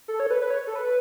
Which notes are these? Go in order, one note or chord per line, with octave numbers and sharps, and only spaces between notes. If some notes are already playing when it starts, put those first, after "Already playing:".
A4
C#5
A4
B4
B4
C#5
A4
B4